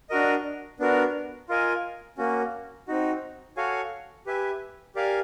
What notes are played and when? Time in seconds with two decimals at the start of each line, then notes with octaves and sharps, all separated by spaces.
0.10 D4 F#4 A#4 D#5
0.80 B3 D4 F#4 A#4
1.49 F4 A#4 D#5 G#5
2.18 A#3 C#4 F#4
2.88 C4 D#4 F#4
3.57 F#4 A4 C#5 F5 G#5
4.26 G4 B4 E5 G#5
4.95 G4 A#4 D5 F5 G#5